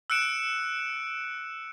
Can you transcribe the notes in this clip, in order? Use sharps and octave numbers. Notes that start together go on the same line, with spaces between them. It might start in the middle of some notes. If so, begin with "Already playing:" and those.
E6 F#6 C#7 D7 E7